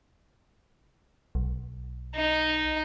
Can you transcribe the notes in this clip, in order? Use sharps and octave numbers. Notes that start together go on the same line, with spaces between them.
B1
D#4